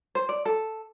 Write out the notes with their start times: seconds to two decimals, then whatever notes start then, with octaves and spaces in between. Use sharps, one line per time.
0.15 C5
0.29 D5
0.45 A4